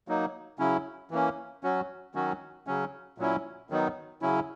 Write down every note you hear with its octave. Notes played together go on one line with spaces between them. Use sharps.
F#3 A#3 D#4
C#3 F#3 C#4 E4
E3 A#3 C#4
F#3 C#4 F#4
D#3 F#3 C#4 F#4
C#3 F#3 C#4
A#2 F#3 C#4 E4
D#3 F#3 B3 D#4
C#3 F#3 C#4 E4